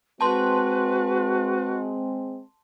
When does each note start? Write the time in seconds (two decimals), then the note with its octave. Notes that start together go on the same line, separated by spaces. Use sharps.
0.21 G#3 C4 F#4 B4 A5 C6